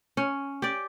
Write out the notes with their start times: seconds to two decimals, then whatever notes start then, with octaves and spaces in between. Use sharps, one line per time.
0.17 C#4
0.62 G4 D5